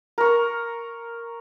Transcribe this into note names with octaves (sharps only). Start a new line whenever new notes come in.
A#4 C#6